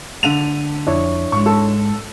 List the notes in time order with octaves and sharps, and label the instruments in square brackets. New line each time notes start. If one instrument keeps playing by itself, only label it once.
[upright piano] D3 D#7 F7 [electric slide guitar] A3
[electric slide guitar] F2 [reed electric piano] D4 E4 C#5
[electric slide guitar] G#2 G#3 [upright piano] C#6
[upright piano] A4